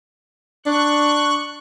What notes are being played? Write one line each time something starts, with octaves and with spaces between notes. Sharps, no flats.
D4 C#6 F#6